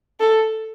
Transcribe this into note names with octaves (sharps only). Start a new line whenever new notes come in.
A4